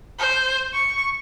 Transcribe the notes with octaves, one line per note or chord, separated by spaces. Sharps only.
C5
C#6